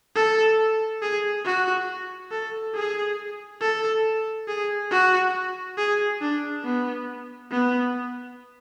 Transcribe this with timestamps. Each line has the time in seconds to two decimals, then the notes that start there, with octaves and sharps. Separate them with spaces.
0.16 A4
1.02 G#4
1.45 F#4
2.31 A4
2.75 G#4
3.61 A4
4.48 G#4
4.91 F#4
5.78 G#4
6.21 D4
6.64 B3
7.51 B3